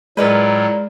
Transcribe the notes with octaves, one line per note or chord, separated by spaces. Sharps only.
A2 F#3 G#3 F4 A#4 B4 D5 F6